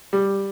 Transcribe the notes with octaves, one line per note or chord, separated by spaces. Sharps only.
G3